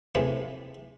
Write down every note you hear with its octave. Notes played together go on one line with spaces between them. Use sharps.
A2 C3 E3 F3 G#3